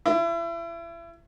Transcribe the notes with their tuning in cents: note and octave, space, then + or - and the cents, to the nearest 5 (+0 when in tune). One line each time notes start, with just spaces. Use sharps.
E4 +35